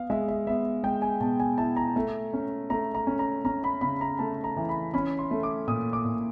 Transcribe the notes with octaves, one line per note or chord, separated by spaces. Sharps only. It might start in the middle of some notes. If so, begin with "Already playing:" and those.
Already playing: B3 F5
G#3 E5
E5
B3 E5
G#3 G5
G#5
B2 A5
G#5
E4 A5
A#5
A3
C#4
A3 A#5
A#5
C#4
A#5
C#4 A#5
B5
C#3 B5
A#5
A3 A5
A#5
E3
B5
C#4 B5
C6
A3
D6
A#2 D#6
D6
A#2